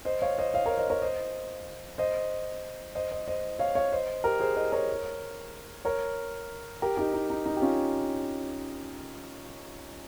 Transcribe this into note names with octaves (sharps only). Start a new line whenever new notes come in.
C5 D#5
C#5 F5
C5 D#5
C#5 F5
A#4 C#5
C5 D#5
A#4 C#5
C5 D#5
C5 D#5
C5 D#5
C5 D#5
C5 D#5
C#5 F5
C#5 F5
C5 D#5
G4 A#4
G#4 C5
C5 D#5
A#4 C#5
A#4 C#5
G4 A#4
D#4 G4
D#4
D#4
D#4
G4
C#4 F4